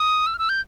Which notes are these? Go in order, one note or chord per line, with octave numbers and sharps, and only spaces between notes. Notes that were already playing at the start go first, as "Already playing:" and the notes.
Already playing: D#6
E6
F6
E6
G6